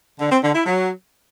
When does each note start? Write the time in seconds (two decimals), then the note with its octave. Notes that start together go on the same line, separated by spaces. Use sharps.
0.19 D3
0.31 C4
0.42 D3
0.54 E4
0.66 F#3